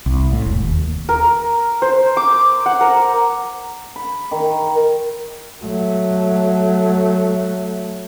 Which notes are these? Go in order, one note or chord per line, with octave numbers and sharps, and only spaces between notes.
C2
A2
E1
D#2
A#4
C5
D6
F#5
A#4
B5
D#3
F#3 A3